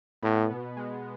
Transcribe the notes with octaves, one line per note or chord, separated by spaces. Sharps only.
A2 B3
B2
G#3